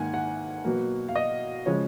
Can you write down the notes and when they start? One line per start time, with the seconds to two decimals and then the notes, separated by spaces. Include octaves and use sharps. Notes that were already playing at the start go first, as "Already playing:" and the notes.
Already playing: G#2 D#3 A#3 F#5 G#5
0.14 F#5
0.64 B2 F#3 A#3
1.09 F5
1.16 D#5
1.66 C#3 F3 G#3 C#5